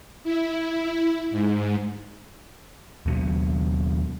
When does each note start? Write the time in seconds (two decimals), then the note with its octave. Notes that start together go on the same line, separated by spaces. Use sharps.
0.24 E4
1.31 G#2
3.06 D#2 B2 F#3